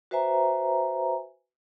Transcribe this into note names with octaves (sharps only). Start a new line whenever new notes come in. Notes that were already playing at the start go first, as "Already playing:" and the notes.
F#4 B4 C5 E5 G#5 A#5